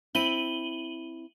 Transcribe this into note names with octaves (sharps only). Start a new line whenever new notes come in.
C4 E4 D#7 F#7 G7